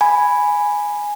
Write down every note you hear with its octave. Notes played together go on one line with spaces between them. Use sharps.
G#5 B5